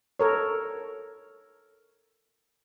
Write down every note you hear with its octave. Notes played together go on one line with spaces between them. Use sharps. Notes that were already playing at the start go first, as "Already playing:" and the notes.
A4 A#4 C#5